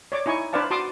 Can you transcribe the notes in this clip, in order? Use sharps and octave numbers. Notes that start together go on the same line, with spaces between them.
C#5 D5 D6
D#4 E4 G#5 C#6
D4 B4 C5 D5 F5 A5
F#4 A5 C6 D6 D#6